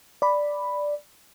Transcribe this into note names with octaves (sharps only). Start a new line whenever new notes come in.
D5 B5